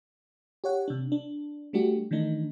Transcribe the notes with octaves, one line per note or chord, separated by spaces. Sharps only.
G4 C#5 F#5
C3 D4
D4
G3 A3 D4 F#4 G4
D#3 E3 A3 D4 D#4